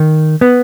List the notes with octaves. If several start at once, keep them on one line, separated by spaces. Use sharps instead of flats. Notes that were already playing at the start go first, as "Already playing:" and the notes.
Already playing: D#3
B3